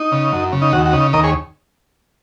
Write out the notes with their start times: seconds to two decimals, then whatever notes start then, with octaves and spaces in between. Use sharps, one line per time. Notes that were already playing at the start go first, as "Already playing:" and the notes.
Already playing: D#4
0.12 C#3
0.32 F#2
0.52 C#3
0.62 D#4
0.73 D#2 F#4
0.85 F#4
0.93 C#3 D#4
1.13 D#2 A#4 D#5
1.24 G#4 C#5